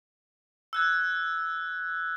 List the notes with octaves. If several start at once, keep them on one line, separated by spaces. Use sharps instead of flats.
E6 F#6 G#6